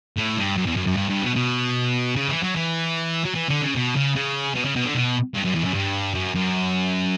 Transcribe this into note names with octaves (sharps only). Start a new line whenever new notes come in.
A2
G2
F#2
E2
F#2
F#2
G2
G2
B2
B2
C#3
E3
F#3
E3
F#3
E3
D3
C#3
B2
C#3
C#3
B2
C#3
B2
D3
B2
G2
F#2
E2
F#2
G2
F#2
F#2